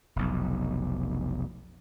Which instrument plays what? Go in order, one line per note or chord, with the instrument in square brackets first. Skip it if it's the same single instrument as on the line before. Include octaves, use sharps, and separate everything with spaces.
[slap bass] F1 B1